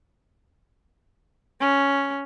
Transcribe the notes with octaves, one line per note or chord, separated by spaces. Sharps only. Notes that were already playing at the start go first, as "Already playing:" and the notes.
C#4